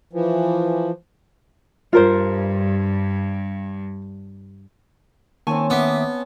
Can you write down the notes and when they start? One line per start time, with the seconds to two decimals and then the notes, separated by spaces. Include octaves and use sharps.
0.13 E3 F3
1.93 G2 F4 A#4 C5
5.47 D#3 A#3 C4 C#4 G#5 A5 C#6
5.70 B3 E5 D6 D#6